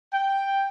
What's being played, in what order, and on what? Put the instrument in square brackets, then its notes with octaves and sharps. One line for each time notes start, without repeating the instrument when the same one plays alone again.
[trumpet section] G5